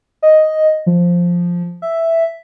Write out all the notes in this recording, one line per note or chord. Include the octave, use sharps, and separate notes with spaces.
D#5
F3
E5